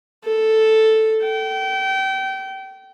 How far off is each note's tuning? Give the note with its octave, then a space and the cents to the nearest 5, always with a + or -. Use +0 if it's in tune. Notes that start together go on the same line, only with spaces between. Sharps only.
A4 +0
G5 -30